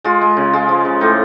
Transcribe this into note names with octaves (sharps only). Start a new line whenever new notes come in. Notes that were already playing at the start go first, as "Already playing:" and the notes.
G#3 F4
G#3
C#3
G#3 F4
F3
C#3
A2 D#4